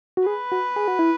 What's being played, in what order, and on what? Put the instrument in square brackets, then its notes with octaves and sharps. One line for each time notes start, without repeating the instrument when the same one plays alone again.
[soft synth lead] F#4
[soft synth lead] G#4 [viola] B4
[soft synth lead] F#4
G#4
F#4
E4